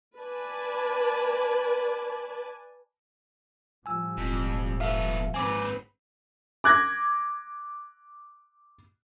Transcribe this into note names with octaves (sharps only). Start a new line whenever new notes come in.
B4 D5 G#5 A5
A2 F3 G3 G#5 E6
E1 F2
B3 A4 E5 F5
G#1 C4 B4 G#5 D6
D6 F#6 G#6 A#6